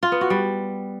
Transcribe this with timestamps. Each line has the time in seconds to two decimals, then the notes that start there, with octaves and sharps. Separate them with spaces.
0.03 F4
0.12 B3
0.21 F#4
0.30 G3